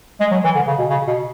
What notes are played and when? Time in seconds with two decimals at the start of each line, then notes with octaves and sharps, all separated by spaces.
0.20 G#3
0.31 F#3
0.44 E3
0.55 D3
0.67 C#3
0.79 B2
0.90 C#3
1.07 B2